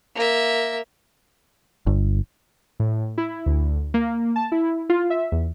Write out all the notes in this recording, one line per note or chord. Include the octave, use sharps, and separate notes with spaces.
A#3 E5
G1
A2
E4
D2
A#3
A5
E4
F4
E5
E2